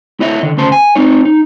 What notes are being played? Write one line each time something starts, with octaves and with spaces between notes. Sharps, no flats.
E4 C#5 D#5 E5
D3 D#3
D2 C#3 C5 A5
G#5
C4 D#4 C#5
D#4